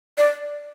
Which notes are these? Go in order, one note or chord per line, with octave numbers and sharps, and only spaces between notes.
D5